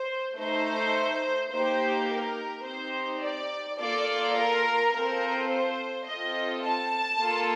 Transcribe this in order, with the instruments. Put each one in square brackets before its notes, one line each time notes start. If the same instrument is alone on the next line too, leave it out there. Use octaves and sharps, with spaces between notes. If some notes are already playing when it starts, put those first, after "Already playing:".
Already playing: [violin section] C5
A3 D#4 A4 C5
A#3 D#4 G4 C5
A#4
C4 D#4 G4 C5
D5
A#3 F4 A4 D5
A#4
C4 F4 A4 A#4
C5
C4 F4 A4 D#5
A5
A#3 F4 A4